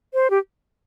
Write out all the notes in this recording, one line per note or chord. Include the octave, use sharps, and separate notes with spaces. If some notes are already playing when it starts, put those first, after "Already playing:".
C5
G4